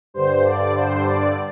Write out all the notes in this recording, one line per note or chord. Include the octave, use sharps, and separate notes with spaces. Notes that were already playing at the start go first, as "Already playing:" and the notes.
G2 D3 C5
D5
C5
D5